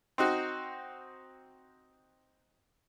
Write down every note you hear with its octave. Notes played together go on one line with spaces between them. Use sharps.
C4 D#4 F#4